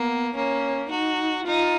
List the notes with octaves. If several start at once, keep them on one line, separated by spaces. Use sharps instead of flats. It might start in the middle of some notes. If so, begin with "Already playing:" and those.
Already playing: A#3 B3
A#3 C#4
D#4 F#4
D#4 F4